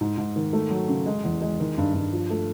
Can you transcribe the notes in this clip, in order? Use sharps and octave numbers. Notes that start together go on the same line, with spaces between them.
G#2
G#2
D#3
A3
F#3
C#3
G#3
E2
G#3
D#3
G2
G2
F3
A3